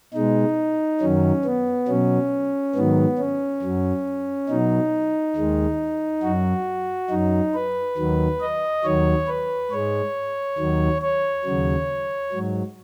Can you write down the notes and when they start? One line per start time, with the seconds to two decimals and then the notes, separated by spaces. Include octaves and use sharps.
0.14 B2 G#3 D#4
1.01 F#2 D#3 F#3 C#4
1.45 B3
1.88 B2 F#3 C#4
2.75 G#2 D#3 F#3 B3
3.19 C#4
3.62 F#2 F#3
4.49 B2 F#3 D#4
5.36 D#2 D#3 G#3
6.23 F#2 F#3 F#4
7.10 F#2 F#3 D#4
7.54 B4
7.97 D#2 D#3 F#3
8.41 D#5
8.84 D#2 D#3 F#3 C#5
9.27 B4
9.71 G#2 G#3 C#5
10.58 D#2 D#3 F#3
11.02 C#5
11.45 D#2 C#3 F#3
12.32 G#2 F#3